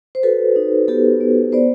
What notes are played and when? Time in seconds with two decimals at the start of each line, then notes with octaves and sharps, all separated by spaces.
0.15 C5
0.23 F#4 A4 B4
0.56 D#4
0.88 B3 G4 A4
1.21 B3
1.52 B3 C5 D5